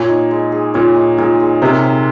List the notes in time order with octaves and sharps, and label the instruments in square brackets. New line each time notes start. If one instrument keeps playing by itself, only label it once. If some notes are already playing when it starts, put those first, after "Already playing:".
Already playing: [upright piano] A#2 [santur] C#5
[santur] D#4
G#3
G#4
[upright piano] A#2 [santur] C#5
[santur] D#4
[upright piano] A#2 [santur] G#3
[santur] G#4
[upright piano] C3 [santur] A#4
[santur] C4